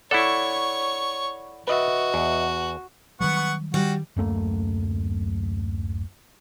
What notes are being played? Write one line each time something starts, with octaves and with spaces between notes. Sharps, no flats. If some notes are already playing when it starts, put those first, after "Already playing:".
E4 A4 C#5 D5 F#5 B5 C#6
F#4 B4 D#5 E5
E2
D#3 F#3 G3 B3 F#5 C#6
D#3 G3 F#4
D1 F#2 A3 A#3